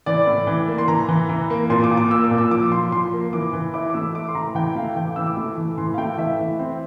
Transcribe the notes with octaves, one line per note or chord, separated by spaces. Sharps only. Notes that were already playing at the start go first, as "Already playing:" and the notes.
E3 D5
A2
E3
A#3
C6
E3 A#5
E3
E3
A#3
A#2 C6
D6
A#2
D6
A#3 E6
D6
A#2
E6
F3 D6
F3 C6
F3 C6
A#3
E3 D6
E3
E4 D6
D6
A3 E6
E4 D6
C6
E3 A#5
E3 G5
A3 F5
E3 G5
D6
E3 E6
D6
A3
E3
E3 C6
F5
A3 G5
E3 E5
E3
C4